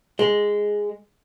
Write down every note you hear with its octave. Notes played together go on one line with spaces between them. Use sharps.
G#3